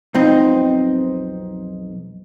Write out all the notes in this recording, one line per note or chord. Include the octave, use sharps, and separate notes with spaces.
B1 F2 C4 D#4